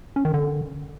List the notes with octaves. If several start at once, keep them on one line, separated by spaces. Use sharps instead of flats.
C#4
D#3
D3